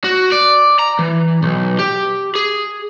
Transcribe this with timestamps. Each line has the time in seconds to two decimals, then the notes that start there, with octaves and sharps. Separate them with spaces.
0.04 F#4
0.32 D5
0.79 A#5
0.99 E3
1.43 B1
1.79 G4
2.35 G#4